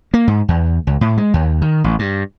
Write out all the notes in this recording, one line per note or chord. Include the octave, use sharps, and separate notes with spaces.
A#3
G#2
E2
C#2
A2
G#3
D#2
D#3
A1
G2